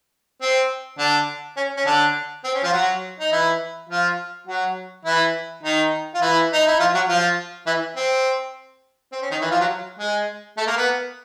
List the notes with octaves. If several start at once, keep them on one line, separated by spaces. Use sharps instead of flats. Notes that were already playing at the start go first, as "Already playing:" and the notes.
C4
D3 D4
C#4
C#4
D3 D4
C4
C#4
F3 F4
F#3 F#4
D#4
E3 E4
F3 F4
F#3 F#4
E3 E4
D#3 D#4
F4
E3 E4
D#4
E4
F3 F4
F#3 F#4
F3 F4
E3 E4
C4
C4
C#4
D#3 D#4
E3 E4
F3 F4
F#3 F#4
G#3 G#4
A3 A4
A#3 A#4
B3 B4